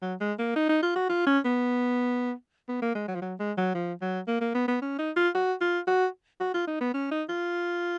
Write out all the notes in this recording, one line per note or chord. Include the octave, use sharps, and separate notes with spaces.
F#3
G#3
A#3
D#4
D#4
F4
F#4
F4
C#4
B3
B3
A#3
G#3
F#3
F3
F#3
G#3
F#3
F3
F#3
A#3
A#3
B3
B3
C#4
D#4
F4
F#4
F4
F#4
F#4
F4
D#4
B3
C#4
D#4
F4